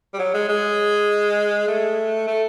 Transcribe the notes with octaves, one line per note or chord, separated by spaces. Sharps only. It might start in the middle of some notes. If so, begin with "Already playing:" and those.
G3
F#3
G#3
G#3
A3
A3